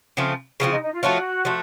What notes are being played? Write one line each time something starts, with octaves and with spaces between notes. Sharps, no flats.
C#3 F3 A3 C4
C#3 F3 A3 C4 F4
D#4
D#4
F4
F3 A3 C#4 F4 F#4
F3 A3